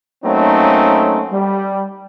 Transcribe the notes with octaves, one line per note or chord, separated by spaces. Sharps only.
F#3 A3 A#3 C4 C#4 D#4
G3